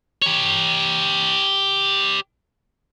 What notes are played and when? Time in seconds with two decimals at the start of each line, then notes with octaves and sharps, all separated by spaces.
0.22 G4 C#5